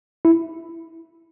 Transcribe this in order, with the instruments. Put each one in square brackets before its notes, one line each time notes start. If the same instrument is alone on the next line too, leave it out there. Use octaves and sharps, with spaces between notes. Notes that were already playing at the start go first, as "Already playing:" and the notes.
[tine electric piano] E4